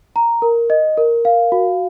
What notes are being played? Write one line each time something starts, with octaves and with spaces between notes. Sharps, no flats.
A#5
A#4
D#5
A#4
F5
F#4